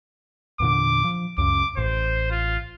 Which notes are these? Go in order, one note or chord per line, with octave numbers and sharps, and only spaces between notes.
E2 A#2 D3 D6
F3
C#2 F#2 C#3 D6
A1 C5
F4